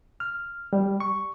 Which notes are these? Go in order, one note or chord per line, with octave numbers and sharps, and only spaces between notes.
F6
G3
C#6